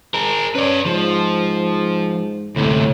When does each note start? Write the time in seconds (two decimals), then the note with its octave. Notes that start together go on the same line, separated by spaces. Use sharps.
0.14 G#4 A#4
0.55 C#4 B4 D5
0.86 G#2 F3
2.56 D2 A2 C3